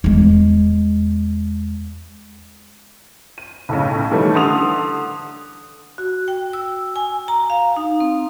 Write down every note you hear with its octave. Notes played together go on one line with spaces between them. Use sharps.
E2 G#3
D#7
B1 A2 C#3
D#3 E3 G3 A3 C#4 D#4
D3 C6 D#6 F7
F#4
G5
E6
G#5
A#5
F5
D#4
C4